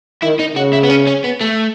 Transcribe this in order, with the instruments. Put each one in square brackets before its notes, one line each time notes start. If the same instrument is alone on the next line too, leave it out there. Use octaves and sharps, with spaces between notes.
[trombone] D#3 [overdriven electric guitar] E4
[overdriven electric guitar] D#4
[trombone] C#3 [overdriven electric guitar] F#4
[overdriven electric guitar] E4
B3
C#4
C#4
B3
A3